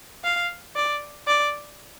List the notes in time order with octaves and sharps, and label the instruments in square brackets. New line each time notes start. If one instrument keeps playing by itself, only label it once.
[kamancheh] F5
D5
D5